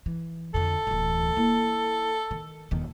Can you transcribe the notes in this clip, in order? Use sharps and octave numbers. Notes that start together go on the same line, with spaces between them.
E3
F2 D3 A4
D1 E3
A#3 E4
D#3
D#1 D#3